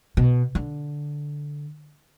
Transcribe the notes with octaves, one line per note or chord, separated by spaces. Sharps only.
B2
D3